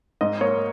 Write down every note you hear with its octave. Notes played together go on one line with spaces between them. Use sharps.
G#2 D#5
A#3 C#5